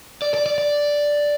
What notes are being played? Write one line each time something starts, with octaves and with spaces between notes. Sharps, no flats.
D5
D5
D5
D5